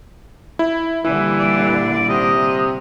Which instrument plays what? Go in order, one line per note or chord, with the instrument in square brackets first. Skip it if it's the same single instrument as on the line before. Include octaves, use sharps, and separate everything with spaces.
[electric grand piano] E4
[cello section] A#2 D3 G3 [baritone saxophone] E3 [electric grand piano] E4
[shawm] D5
[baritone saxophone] C3 [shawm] D#5